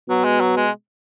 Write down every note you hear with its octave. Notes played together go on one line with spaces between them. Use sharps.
B2 F#3
G#3
F#3
G#3